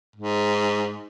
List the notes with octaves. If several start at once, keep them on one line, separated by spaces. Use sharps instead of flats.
G#2